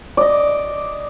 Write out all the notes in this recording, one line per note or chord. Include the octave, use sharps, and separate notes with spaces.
D5 D#5